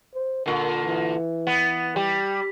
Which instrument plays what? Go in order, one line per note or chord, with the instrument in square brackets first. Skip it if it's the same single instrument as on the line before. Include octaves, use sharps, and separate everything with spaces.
[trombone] C5
[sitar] A#2 D3 [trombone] A#4
[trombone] E3
[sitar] B3
G3